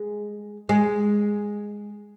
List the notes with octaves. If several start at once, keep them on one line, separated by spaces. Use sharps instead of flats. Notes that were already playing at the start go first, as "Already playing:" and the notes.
Already playing: G#3
G#3